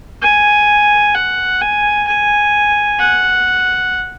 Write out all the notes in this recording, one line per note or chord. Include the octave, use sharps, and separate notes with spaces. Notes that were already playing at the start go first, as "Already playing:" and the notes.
G#5
F#5
G#5
G#5
F#5